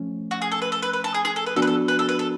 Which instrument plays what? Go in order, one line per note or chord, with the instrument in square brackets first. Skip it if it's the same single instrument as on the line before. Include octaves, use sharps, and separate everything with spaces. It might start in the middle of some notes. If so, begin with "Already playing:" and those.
Already playing: [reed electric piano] F3 A3 C#4
[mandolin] F#4
G#4
A4
B4
A4
B4
B4
A4
G#4
G#4
A4
B4
[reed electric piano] F3 B3 D4 F#4 [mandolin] A4
[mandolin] B4
A4
B4
A4
B4
A4